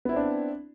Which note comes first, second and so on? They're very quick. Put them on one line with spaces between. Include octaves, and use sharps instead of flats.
B3 E4 C4 D4